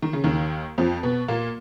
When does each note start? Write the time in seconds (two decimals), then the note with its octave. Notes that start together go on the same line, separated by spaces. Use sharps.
0.02 D#3
0.13 C#3
0.24 D#2 D#3
0.78 F2 F3
1.03 B2 B3
1.28 A#2 A#3